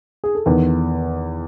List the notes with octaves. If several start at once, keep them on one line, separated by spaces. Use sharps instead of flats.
G#4
A4
E2 D#3 B4